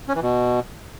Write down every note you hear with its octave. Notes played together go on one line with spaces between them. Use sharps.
C#4
E3
B2